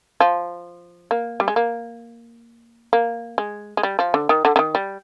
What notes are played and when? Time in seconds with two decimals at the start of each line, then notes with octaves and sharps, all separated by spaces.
0.21 F3
1.11 A#3
1.40 G3
1.48 G#3
1.56 A#3
2.93 A#3
3.38 G#3
3.77 G#3
3.83 G3
3.99 F3
4.14 D3
4.29 D#3
4.45 D3
4.56 D3
4.59 D#3
4.75 G3